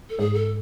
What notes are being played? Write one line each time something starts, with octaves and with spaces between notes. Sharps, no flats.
A4
G#2 G#4
A4